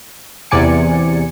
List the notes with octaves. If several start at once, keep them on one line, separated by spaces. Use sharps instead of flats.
E2 C3 D5 G#5 C#7